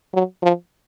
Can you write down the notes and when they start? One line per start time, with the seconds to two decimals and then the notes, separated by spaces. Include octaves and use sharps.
0.13 F#3
0.42 F3